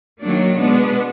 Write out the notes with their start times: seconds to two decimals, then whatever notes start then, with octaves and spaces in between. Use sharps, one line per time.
0.21 D#3 F#3 A#3 D4
0.57 B2 G#3 B3 D4